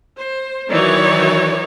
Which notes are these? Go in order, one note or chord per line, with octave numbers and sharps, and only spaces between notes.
C5
D#3 E3 F#3 D#4 C#5 D5